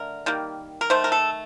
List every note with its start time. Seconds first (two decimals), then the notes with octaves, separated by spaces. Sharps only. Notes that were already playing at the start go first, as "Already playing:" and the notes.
Already playing: D3 A3 A#4
0.26 D#3 G3 A#3
0.81 A#4
0.90 D#3 A3 C5
1.04 A#4
1.12 A4